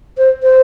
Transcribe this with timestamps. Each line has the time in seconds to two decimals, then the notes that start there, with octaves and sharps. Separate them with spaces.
0.18 C5
0.43 C5